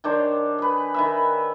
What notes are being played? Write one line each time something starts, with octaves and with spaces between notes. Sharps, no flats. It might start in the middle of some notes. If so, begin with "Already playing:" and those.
D#3 D4 C5 C#5
G#4 B4
D#3 B4 E5